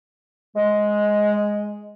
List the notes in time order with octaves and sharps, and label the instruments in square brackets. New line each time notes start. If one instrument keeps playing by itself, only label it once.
[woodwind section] G#3 [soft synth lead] D#5